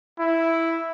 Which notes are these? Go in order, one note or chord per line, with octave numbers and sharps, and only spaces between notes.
E4